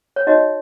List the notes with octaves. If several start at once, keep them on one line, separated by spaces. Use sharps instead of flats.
C#5
D#4 F#4 C#5 D#5